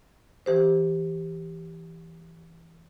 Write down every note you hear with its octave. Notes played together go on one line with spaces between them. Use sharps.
E3 G4 C5